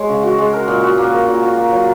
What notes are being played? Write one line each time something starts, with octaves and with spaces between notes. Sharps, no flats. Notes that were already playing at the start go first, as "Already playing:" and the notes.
Already playing: G#3 C#5
C#3
F#4
G#3
A#4
A#2
F#4
A#3
A#4
A#2
F#4
A#3
F#3